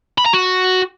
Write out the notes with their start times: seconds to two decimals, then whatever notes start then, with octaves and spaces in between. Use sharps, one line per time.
0.18 B5
0.26 A#5
0.33 F#4